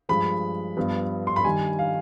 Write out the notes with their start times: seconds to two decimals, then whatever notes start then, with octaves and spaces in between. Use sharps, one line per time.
0.09 G2 F3 G#3 B5
0.77 G2 F3 B3
1.27 C6
1.36 B5
1.44 G2 D#3 G3 G#5
1.79 F5